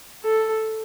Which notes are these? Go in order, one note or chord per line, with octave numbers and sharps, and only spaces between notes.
A4